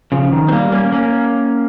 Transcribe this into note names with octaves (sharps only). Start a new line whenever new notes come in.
C#3 F3
D#3
C4
G3 A#3
A#3 C#4
A#3 C#4